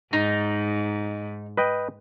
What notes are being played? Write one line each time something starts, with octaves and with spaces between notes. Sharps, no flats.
G#2 D#4
B4 D#5 G5